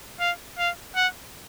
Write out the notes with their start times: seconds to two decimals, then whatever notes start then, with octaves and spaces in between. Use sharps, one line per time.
0.20 F5
0.58 F5
0.96 F#5